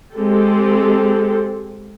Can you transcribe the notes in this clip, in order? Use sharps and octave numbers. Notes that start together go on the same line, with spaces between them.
G#3 C4 G4 A4